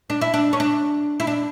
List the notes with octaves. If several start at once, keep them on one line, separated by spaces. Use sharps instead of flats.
D4
E4
D4
C#4
D4
E4
D4